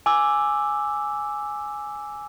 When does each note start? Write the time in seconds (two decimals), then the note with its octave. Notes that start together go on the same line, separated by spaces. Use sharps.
0.06 G#5 D6 E6